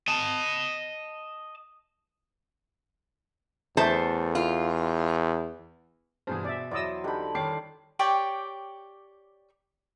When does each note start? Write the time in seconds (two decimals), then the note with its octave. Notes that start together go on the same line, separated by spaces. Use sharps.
0.08 D#5 A5
3.77 E2 A3 C5 A5
4.35 F4
6.27 G2 B2 E3 G#4 C5
6.45 B2 D5 E5
6.71 E2 F#3 E4 C5 D5 D#5 E6
7.04 D3 D#4 G4 A4 B5
7.35 D#3 G3 C#5 G5 D6 C7
7.99 G4 C#5 D5 G5